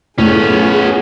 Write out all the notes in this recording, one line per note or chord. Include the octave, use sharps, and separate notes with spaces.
A2 B3 C#4 F4 G#4